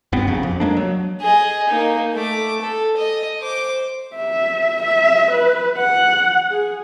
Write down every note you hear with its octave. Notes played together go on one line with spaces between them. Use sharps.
E1 G2 B3 C4
A#1 C#3
F2
G#3 A#3 D4
F#3
G#4 D#5
A#3 D#4
A3 D6
A4
D#5
C5 D6
E5
E5
B4
F#5
G#4